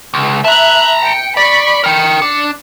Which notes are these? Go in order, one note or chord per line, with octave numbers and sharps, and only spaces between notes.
C#2
E5 A5 A#5 F#6
G5 C#7
D5 B5 C#6
A#4 G5 C#7
D4